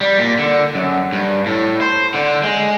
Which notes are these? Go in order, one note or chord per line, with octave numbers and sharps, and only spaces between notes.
G3
A#2
D3
F#2
G2
A2
C5
D3
G#3